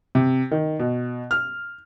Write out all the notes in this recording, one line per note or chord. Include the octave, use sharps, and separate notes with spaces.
C3
D#3
B2
F6